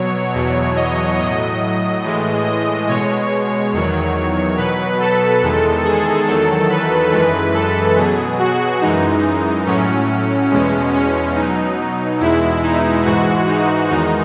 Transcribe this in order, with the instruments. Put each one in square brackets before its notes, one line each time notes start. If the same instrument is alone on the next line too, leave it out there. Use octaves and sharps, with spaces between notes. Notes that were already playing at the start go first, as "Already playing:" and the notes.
Already playing: [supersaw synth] B2 F#3 C#5
E2 B2 F#3
D#5
A2 F#3 D#5
A2 E3 G#3
D#5
B2 G#3 C#5
E2 D#3 F#3
B2 F#3 B4
A4
E2 D#3 G#3
G#4
E2 D#3 F#3 A4
B4
F#2 E3 G#3 B4
A4
B2 F#3 G#4
F#4
F#2 E3 G#3 D#4
A2 F#3 C#4
E2 B2 G#3 C#4
C#4
B2 F#3 D#4
E2 B2 G#3 E4
D#4
G#2 E3 G#3 F#4
D#4
E2 D#3 G#3 D#4